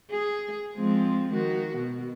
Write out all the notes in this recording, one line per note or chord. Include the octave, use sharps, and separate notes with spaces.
G#4
F3 G#3 C4
D#3 F#4
B2